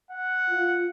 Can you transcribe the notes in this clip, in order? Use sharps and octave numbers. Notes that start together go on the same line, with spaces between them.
F#5
F4